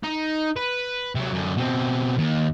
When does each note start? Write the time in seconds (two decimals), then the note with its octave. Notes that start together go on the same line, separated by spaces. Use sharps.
0.04 D#4
0.57 B4
1.15 C3 F#3
1.33 F#2 D3
1.57 B2 C4
2.18 D#2